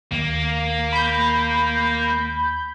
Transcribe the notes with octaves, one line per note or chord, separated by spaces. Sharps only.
D#2 A#3
B5 G6